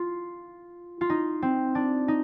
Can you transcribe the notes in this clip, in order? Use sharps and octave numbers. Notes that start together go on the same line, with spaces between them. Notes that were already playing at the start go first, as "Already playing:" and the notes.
Already playing: F4
F4
D#4
C4
D4
D#4